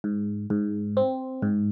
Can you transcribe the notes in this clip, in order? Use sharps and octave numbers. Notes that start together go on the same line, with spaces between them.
G#2
G#2
C4
G#2